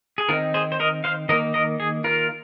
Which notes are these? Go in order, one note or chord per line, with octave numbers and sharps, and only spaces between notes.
G#4
D#3 C4 D#4 F4 A#4
G#4 C5
C5
A#4 D#5
C5 F5
D#3 A#3 D#4 A#4 D#5
A#4 D#5
G#4
F4 A#4